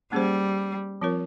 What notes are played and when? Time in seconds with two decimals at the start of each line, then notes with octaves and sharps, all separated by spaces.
0.12 G3 A#3 C#4 G#4 C5
1.01 F3 C4 F4 A#4 C#5